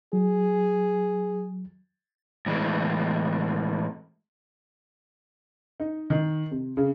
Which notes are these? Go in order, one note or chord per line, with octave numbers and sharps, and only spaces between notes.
F#3 G#4
A2 E3 G#3
D#4
D#3
C3
C#3